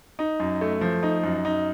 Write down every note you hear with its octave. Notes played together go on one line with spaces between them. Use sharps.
D#4
F#2
A3
F3
D#4
F#2
D#4